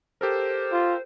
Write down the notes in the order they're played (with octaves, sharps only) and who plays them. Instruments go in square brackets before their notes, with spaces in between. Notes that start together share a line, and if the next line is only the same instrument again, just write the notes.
[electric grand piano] G4 A4 A#4 [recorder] C5
[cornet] F4